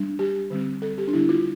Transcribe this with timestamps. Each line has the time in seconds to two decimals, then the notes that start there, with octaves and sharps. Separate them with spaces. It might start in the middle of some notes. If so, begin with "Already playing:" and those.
Already playing: G3 D4
0.19 G4
0.50 D3 G3 C4
0.82 A4
0.98 G4
1.07 D4
1.13 D3 G3 B3 E4
1.29 F4